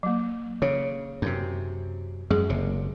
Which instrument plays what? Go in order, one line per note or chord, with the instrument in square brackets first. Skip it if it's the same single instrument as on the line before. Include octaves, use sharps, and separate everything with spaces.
[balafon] F#3 A#3
[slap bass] C#3 [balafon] C#5
[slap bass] F#2 C3
[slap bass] F#2 G#3 [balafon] G#4
[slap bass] F#1 C3